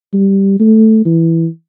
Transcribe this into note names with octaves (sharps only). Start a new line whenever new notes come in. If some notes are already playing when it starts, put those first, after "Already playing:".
G3
A3
E3